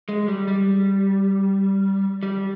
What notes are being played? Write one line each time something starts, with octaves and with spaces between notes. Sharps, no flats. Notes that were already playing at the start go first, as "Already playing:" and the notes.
G#3
G3
G3
G3